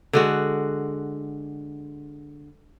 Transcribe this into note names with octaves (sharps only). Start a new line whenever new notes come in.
D3 G#3 F#4